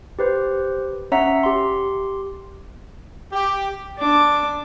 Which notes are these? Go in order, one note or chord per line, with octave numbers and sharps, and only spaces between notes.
G4 B4 C5
C#4 C#5 E5 F#5 A#5 B6
G4 C6
G4
D4 D6